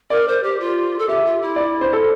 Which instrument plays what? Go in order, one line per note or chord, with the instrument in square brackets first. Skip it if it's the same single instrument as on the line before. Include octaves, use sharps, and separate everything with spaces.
[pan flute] A#4 [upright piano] D5
[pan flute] C5
G4
F4
A4
[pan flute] G4 [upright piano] E5
[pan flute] F4
E4
[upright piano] D5
C5
A4